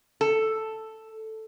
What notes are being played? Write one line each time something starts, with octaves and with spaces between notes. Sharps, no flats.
A4